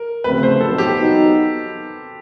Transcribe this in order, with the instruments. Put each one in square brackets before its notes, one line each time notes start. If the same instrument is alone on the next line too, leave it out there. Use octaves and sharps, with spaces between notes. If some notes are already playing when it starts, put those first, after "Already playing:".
Already playing: [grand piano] A#4
[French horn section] D2 C#3 F3 A3 C4 [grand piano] B4
[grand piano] C5
[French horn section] E2 B2 F#3 B3 D#4 [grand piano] A4
[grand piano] G4
[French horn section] F#3 B3 D#4 F#4